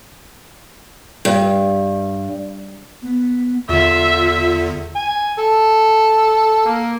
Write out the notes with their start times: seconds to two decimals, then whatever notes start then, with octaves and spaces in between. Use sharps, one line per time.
1.25 G2
3.02 B3
3.69 E2 D3 F4 E5
4.96 G#5
5.39 A4
6.66 A#3